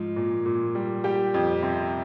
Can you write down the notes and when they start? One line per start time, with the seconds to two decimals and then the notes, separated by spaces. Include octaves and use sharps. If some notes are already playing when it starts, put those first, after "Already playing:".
Already playing: G#2 F3
0.16 A#2
0.46 A#2
0.75 G3
1.04 G3 G4
1.34 F2
1.63 C3